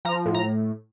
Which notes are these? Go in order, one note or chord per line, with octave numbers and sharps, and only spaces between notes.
F3 A#5
A2
A#5